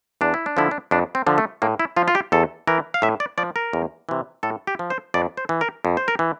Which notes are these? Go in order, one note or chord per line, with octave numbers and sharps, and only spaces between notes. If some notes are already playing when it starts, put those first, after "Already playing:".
E2 D4
E4
D4
D3 F3 E4
D4
F2 D4
C4
D3 F3
A3
A2 A#3
E4
F3 F4
F4
G4
E2 A4
E3 A#4
F5
A2 E5
D5
F3 D5
A#4
E2
C3 E3
A2 A4
G4
F3
C5
F2 D5
C5
E3
A#4
F2
C5
A#4
E3